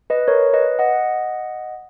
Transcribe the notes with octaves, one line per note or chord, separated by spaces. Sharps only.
B4 D#5
A#4 C#5
B4 D#5
D#5 F#5